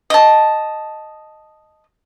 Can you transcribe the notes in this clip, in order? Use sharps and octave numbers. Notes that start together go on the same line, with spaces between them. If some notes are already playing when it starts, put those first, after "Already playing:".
D#5 A5